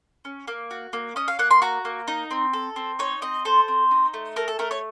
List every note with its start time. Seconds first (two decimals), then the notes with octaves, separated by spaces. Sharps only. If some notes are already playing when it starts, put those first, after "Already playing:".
0.25 C#4
0.48 A#3
0.71 F#4
0.93 A#3
1.16 C#4 D#5
1.28 F5
1.39 A#3 F#5
1.51 C6
1.62 F#4 A#5
1.85 A#3
2.08 D#4
2.31 C4
2.53 A4
2.76 C4
2.99 D#4 C#5
3.22 C4 D#5
3.45 A4 C5
3.68 C4
3.91 D#4
4.14 A3
4.36 A4 A#4
4.48 A4
4.59 A3 A#4
4.71 C#5